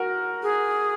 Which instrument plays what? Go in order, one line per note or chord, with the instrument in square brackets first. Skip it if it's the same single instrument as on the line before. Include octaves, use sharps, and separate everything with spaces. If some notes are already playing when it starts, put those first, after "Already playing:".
Already playing: [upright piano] F#4 A#4
[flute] G#4